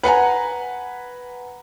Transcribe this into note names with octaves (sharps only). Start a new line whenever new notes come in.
B4 F#5 G#5 A#5